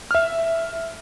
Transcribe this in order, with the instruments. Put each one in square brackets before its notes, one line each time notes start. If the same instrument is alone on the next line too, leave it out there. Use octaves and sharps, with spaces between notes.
[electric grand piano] E5 F6